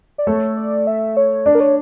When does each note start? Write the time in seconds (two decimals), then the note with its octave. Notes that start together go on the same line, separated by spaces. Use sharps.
0.18 D5
0.27 A3 A4 C#5
0.57 D5
0.87 E5
1.17 C#5
1.46 D4 D5
1.55 A#4
1.60 C#5